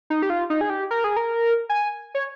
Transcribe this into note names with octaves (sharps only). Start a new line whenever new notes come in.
D#4
G4
F4
D#4
G#4
G4
A#4
G#4
A#4
G#5
C#5